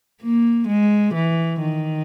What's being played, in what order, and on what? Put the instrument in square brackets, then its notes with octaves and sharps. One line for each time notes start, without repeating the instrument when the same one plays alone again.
[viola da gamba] A#3
G#3
E3
D#3